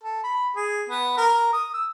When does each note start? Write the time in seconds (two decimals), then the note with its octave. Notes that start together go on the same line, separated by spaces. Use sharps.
0.04 A4
0.24 B5
0.56 G#4
0.89 B3
1.17 A#4
1.53 D#6
1.74 E6